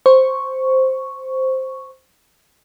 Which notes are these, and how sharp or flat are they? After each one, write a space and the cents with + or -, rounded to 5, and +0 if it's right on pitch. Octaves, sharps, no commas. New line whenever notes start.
C5 +0 C#6 +0